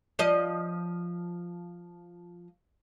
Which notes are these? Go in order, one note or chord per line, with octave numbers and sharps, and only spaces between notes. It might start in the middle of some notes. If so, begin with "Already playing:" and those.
F3 D#5